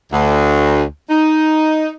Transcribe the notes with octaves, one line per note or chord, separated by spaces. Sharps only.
D2
D#4